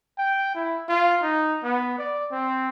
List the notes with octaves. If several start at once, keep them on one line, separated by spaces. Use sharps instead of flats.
G5
E4
F4
D#4
B3
D5
C4